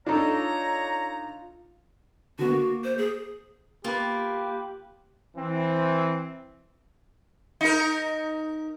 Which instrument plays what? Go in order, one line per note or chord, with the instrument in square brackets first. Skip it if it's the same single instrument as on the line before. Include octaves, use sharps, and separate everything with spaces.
[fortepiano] D4 D#4 A4 [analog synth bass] F4 [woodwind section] C#5 A#5
[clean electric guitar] D3 B3 [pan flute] F#4
[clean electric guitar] A#3
[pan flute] C5
G#4
[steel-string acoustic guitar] A#3 [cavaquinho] F4 B4 [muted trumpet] G4
[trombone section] E3 C4
[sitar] D#4 A#4